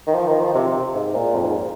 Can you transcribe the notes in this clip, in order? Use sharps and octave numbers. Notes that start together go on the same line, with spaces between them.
D#3
F3
D#3
F3
C3
C3
G#2
A#2
F2
G#2